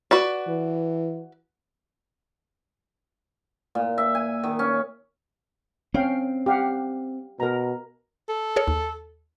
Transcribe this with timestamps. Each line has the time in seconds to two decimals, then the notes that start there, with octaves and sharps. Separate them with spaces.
0.11 F#4 B4 D5
0.48 E3
3.75 A#2
3.98 E5
4.15 G#5
4.43 D#3
4.59 C#4
5.94 C4 C#4 F5 G5
6.46 G4 F5 F#5
7.40 B2 A#4 A#5
8.29 A4
8.56 G#4 A#4 C#5
8.68 D#2